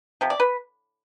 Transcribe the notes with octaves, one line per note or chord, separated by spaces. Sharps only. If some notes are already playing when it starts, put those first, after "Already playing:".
C3 F3
D5
B4